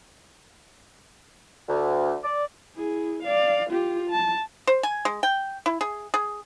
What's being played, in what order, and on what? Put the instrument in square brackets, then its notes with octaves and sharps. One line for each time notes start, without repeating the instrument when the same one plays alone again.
[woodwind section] D2
D5
[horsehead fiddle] E4 G#4
D5 F5
F4 G4
A5
[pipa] C5
G#5
G#3
G5
E4
G#4
G#4